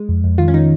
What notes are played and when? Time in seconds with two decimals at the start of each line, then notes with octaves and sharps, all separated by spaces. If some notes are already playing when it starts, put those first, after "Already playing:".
Already playing: G#3
0.09 F2
0.24 F2
0.38 D#3 F4
0.48 C#4
0.54 D#3 D#4